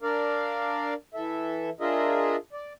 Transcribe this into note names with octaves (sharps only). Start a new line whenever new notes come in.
D4 A#4 D5 F5
E3 A4 E5
D4 F4 G#4 A#4 D#5 E5
D5